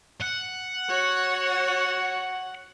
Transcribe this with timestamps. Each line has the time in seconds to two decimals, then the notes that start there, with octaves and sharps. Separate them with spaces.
0.21 F#5
0.89 F#4 C#5